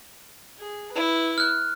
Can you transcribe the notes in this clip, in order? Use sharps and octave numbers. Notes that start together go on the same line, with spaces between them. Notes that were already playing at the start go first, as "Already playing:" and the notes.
G#4
E4 B4
F6 F#6